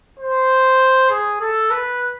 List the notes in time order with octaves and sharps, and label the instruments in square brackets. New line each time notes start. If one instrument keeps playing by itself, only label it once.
[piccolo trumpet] C5
G#4
A4
B4